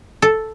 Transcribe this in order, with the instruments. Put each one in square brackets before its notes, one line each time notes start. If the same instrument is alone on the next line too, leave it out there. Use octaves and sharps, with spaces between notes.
[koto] A4